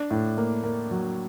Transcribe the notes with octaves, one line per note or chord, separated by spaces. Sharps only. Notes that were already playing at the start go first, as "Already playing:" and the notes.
Already playing: D4
A2
A#3
A#3
F#3